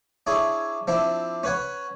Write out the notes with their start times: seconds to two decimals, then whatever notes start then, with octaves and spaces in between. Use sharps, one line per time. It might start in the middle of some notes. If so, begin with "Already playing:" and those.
0.27 D4 E4 G#4 C#5
0.87 F3 C4 D4 E4
1.43 C#4 B4 C#5 F#5